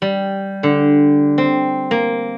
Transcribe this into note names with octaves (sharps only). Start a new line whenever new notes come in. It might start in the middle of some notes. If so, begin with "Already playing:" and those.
G3
D3
C4
A#3